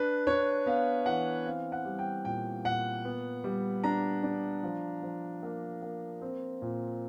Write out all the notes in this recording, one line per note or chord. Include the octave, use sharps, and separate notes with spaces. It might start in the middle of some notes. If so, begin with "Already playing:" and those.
Already playing: D4 B4
D4 C#5
B3 F5
E3 F#5
C4 F5
F#5
G3
G5
A#2 G5
A#2 F#5
B3
G3
D4 A#5
D4
F3
F3
A#3
A#3
C4
A#2